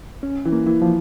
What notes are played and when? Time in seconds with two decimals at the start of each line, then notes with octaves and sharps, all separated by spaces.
0.23 C#4
0.45 E3
0.52 A#3
0.66 E3
0.82 F3